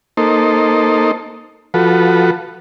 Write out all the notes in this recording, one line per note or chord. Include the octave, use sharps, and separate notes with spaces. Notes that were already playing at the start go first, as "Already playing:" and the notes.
A#3 D#4 A4 C5
F3 F#4 A4 B4